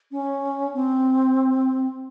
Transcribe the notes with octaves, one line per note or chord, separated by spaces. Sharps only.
C#4
C4